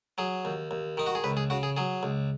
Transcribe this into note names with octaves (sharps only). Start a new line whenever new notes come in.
F#3 G#4
D#2
D#2
D#3 D#4
F#4
G#4
C#2 B4
G#4
C#3 F#4
G#4
F#3 G#4
C#2